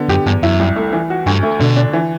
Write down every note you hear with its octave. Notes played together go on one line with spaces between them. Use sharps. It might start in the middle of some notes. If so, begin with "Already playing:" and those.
Already playing: D3 B3
F#2 G4
E2 G2
F#2 E4
C2
A3
E3
F#4
D2 G2
A3
B2 D3
D4
E3